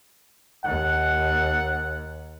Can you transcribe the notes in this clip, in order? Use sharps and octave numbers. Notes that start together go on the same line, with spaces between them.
D#2 F#5